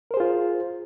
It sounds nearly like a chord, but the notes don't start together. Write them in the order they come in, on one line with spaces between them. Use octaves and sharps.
A#4 C5 G#4 F4